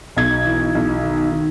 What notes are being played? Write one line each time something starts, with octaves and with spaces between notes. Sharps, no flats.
B1 G#6
E3
B1
D#3
D#3